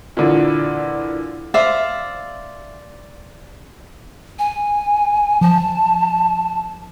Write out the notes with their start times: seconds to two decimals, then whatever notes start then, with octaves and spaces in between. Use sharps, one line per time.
0.17 A#2 D3 E3
1.54 C5 D5 E5 F5
4.39 G#5
5.41 F3 A5